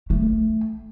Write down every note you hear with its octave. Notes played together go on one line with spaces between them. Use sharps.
A3